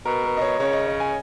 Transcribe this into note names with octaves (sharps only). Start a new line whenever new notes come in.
B2 A#4
A#4
D#5
C#5
C#3 C#5
D#5
D#5
G#5